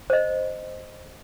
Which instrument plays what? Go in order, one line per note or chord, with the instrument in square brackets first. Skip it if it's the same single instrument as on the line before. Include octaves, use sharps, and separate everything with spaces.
[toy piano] C5 D#5